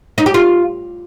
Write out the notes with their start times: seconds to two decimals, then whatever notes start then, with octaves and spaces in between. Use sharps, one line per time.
0.18 D#4
0.26 G4
0.34 F4